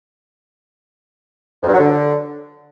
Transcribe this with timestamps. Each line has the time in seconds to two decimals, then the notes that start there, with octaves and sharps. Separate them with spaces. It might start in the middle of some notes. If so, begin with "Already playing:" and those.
1.63 F2
1.68 G2
1.74 F#3
1.79 D3